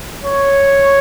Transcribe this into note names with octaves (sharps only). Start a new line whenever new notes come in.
C#5